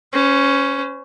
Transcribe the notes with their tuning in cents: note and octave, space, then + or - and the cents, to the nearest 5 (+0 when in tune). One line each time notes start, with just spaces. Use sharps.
C#4 +0 C5 -40